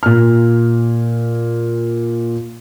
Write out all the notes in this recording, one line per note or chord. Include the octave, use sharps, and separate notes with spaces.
A#2 F6